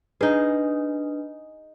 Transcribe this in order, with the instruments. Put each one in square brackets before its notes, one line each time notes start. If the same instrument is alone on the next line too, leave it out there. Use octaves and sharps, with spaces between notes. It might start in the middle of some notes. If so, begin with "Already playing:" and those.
[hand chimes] D4 B4 [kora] D#4 G#4